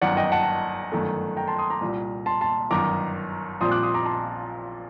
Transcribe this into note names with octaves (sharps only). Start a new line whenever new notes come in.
G1 F#2 D#3 D5 F#5
D#5 G5
F#5 A5
G1 F#2 D#3 A3
G5 A#5
A5 C6
C6 D#6
A#5 D6
C2 A#2 G3
A5 C6
A5 C6
G1 F#2 D#3 A#5 D6
A#1 A#2 G3 C4 C6 D#6
D6 F#6
C6 D#6
A#5 D6
A5 C6